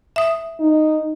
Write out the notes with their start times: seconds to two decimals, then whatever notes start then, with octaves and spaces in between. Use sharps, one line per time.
0.16 E5 D#6
0.60 D#4